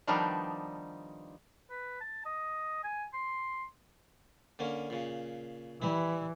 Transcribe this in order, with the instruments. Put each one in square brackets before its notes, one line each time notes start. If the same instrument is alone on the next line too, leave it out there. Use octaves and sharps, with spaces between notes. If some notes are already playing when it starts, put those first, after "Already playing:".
[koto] D#3 F3 G3 B3 D4 D#4
[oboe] B4
A5
D#5
G#5
C6
[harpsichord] D3 A#3 C#4
A#2 C#3
[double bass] E3 [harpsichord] G3 E4